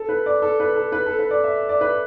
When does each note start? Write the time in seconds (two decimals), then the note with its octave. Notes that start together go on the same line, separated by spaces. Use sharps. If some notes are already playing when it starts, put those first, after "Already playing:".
Already playing: A4
0.09 B4
0.26 D5
0.42 A4
0.60 B4
0.75 A4
0.92 B4
1.06 A4
1.19 B4
1.31 D5
1.44 E5
1.69 D5
1.81 B4